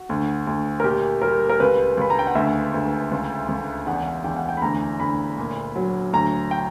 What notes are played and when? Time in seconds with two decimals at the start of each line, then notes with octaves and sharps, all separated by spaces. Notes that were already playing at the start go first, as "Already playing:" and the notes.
Already playing: F#4
0.09 D2
0.47 D2
0.80 A#4
0.84 A#2 G4
1.22 G3 A#4
1.49 A#4
1.60 C#2 B4
1.97 C#2 B5
2.10 A#5
2.19 G5
2.27 F#5
2.35 D2 E5
2.74 D2
3.11 C#2
3.49 C#2
3.87 E2 F#5
4.24 E2 G5
4.36 F#5
4.49 G5
4.57 B5
4.62 D2 A#5
5.00 D2 B5
5.38 A#2
5.76 F#3
6.13 D2 A#5
6.51 G5